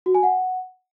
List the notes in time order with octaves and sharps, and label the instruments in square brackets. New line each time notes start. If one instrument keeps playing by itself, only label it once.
[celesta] F#4
G#5
F#5